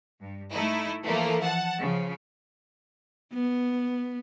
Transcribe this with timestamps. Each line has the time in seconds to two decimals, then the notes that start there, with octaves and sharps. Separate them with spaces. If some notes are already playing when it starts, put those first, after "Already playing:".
0.20 G2
0.51 A3 D#4 E4
1.03 E3 F3 A3 A#3
1.42 F#5 A5
1.78 C#3 F3
3.33 B3